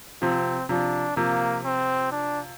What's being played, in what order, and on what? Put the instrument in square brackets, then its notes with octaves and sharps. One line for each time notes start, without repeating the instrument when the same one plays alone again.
[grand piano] C3 F3 [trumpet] C4
[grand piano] C3 F3 [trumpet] D4
[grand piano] C3 F3 [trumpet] A#3
[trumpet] C4
D4